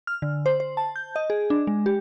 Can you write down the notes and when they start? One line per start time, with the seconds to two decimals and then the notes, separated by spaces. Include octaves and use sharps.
0.07 F6
0.22 D3
0.46 C5
0.60 C5
0.77 A5
0.96 G6
1.16 D#5
1.30 G#4
1.50 D4
1.67 G#3
1.86 G4